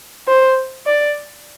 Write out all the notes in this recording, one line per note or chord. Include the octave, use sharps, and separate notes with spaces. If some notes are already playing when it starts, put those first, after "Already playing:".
C5
D5